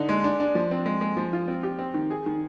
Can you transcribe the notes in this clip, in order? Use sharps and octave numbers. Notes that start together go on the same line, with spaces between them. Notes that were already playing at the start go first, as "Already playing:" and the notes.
Already playing: D3 D#4
G#3
D4
D4
F3
C4
G#3
G#3
F3
F4
C4
G4
C4
D#3
G#4
D#3